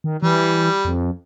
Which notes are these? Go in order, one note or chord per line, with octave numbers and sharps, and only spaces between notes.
D#3
E3 G3
F2